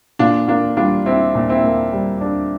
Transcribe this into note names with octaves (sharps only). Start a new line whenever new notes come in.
A#2 D4 F4
A#3 D4 F4
G3 D4 F4
C4 D4 E4
A#2
C4 E4
A#3
G3
D4